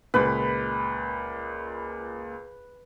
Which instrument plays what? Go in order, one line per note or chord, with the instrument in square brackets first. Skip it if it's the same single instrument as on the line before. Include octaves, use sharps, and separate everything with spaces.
[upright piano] C#2 A#2 [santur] B4